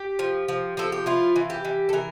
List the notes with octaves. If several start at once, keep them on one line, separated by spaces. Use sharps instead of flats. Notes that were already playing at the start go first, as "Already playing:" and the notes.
Already playing: G4
F3
F3
F3 A4
G4
E4 F4
E3
G4
E3
A4
E3 A#4